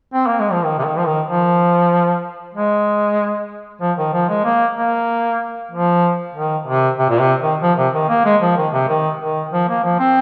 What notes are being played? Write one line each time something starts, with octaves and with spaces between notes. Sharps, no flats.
C4
A#3
G#3
F3
D#3
C3
D#3
F3
D#3
F3
G#3
F3
D#3
F3
G#3
A#3
A#3
F3
D#3
C3
C3
A#2
C3
D#3
F3
C3
D#3
A#3
G#3
F3
D#3
C3
D#3
D#3
F3
A#3
F3
C4